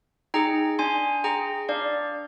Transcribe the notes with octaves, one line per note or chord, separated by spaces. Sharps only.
D#4 G#4 G5 A#5
D4 G#5 C6
G#4 G5 A#5
D4 D5 F5